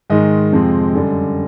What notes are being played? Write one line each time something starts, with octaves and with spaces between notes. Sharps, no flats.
G#2 D#3 G#3 D#5
F2 C3 F3 G#3 C4
F#2 D3 G3